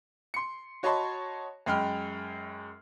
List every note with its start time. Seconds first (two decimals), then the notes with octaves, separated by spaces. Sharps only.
0.34 C6 C#7
0.83 F#4 C#5 D#5 A5 B5 C6
1.66 F#2 G#3 G5 B5 F6